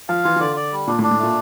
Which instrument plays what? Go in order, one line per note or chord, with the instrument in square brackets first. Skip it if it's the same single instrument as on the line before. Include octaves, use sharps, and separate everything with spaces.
[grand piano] F3 [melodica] F5
[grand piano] E3 [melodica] F4
[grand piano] E3
[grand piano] D3 [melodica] D5
[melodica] D5
G3
[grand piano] A#2 [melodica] D4
[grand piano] A2
[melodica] D4
[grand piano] A2
[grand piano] A#2 [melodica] A3